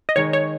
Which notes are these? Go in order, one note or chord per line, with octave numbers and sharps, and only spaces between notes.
D#5
D#3 G#3 D#4 C#5
C#5